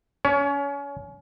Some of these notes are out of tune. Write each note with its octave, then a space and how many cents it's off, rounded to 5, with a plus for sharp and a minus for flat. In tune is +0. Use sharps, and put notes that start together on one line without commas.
C#4 +30 C#5 +20